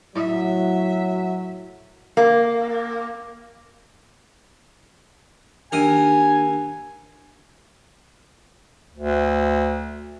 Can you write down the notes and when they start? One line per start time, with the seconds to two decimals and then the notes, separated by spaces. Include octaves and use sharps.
0.16 A2 F#3 E5
2.17 A#3
5.72 D#2 D4 A#4 G#5 D#6
8.95 D2